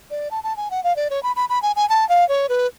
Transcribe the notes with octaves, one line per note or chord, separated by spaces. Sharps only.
D5
A5
A5
G#5
F#5
F5
D5
C#5
B5
B5
B5
G#5
G#5
A5
F5
C#5
B4